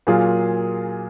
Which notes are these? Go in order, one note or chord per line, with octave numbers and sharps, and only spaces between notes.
A#2 F#3 A#3 F4 G#4